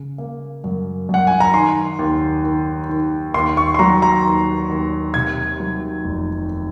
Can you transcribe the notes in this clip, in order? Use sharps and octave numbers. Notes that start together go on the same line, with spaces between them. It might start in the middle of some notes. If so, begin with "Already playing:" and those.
Already playing: C#3
A#3
F#2
F#2 F#5
G#5
A#5
D#3 C6
D#2
D#3
D#3
D#2 C6
C#6
C6
F#3 A#5
A#5
D#2
D#2
C3 G#6
F#3
F1